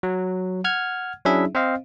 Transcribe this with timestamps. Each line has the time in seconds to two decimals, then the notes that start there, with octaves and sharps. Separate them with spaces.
0.03 F#3
0.64 F#5 F6 G#6
1.25 F#3 C#4 D4 E4 G#4 E5
1.55 C4 C5 D#5 F5